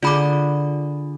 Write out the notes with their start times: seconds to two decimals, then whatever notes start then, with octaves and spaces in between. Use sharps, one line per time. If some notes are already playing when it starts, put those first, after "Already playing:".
0.03 D3 F4 G#4 B5 D6